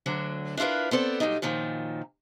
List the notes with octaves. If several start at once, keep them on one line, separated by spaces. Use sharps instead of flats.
D2 D3 F#3 D4
D4 E4 F4 A#4 B4
B3 C4 A4 D5
A#2 F#3 G3 D#4
F#2 A#2 D#3 F3